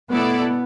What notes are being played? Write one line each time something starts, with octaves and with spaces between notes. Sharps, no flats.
B2 A3 B3 E4 A4 D5